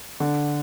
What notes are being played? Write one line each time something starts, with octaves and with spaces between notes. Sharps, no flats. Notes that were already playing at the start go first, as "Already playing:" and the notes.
D3